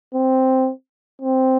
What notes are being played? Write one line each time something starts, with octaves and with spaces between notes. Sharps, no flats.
C4
C4